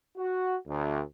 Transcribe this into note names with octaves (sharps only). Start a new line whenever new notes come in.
F#4
D2